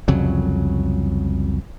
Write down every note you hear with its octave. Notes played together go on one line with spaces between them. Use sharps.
C2 F2 C#3 F#3